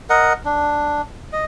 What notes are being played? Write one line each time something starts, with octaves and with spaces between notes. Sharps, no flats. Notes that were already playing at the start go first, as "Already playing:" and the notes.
A#4 D#5 F#5
D4
D#5